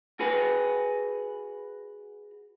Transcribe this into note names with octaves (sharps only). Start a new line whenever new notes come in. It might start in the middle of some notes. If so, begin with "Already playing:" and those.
F#4 G#4 B4